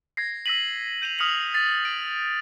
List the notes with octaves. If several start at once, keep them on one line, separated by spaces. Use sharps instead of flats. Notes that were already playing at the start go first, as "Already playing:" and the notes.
G#6 A#6 C7
E6 A#6 B6 D#7 F#7
G6 D#7 F7 F#7
D#6 F6 B6 C#7 F7 F#7
A6 B6
D7